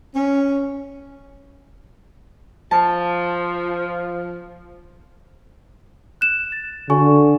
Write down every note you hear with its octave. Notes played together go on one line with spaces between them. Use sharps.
C#4
F3 A5
F#6 E7
A6
D3 F#4 G#5 C#6